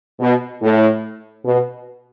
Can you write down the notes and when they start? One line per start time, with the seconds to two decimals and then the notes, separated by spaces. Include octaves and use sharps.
0.20 B2
0.62 A2
1.45 B2